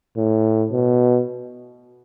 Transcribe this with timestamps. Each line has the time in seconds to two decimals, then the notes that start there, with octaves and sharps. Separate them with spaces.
0.17 A2
0.72 B2